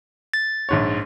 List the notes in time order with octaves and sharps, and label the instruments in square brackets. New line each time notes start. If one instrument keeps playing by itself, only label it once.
[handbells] A6
[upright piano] A#1 G#2 C#5